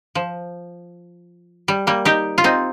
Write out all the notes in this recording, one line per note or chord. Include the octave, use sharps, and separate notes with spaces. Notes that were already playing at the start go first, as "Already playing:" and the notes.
F3
G3
G3 A#3
D#4 G4
F4
C4 D#4